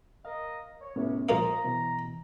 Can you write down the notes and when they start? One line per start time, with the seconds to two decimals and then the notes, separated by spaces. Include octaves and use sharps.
0.25 A#4 D#5 F5
0.81 C#5
0.96 C#2 A2 C3 B3 C#4
1.29 A#1 A#4 C5 F5 A#5 D#6
1.64 B2 E3